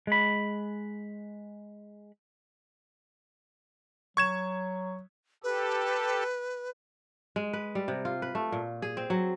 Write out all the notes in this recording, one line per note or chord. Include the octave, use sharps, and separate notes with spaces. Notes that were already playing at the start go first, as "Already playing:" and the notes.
G#3 B5
F#3 C#6 G#6 E7
G4 A4 B4
G#3
B4
G3
C3
F4
B4
A3
A#2
G#4
C4
F#3